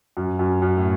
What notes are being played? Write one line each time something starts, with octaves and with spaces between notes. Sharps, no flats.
F#2
F#2
F#2
A2